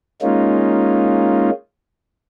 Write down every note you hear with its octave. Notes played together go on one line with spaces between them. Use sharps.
G#3 A#3 C#4 D#4 F4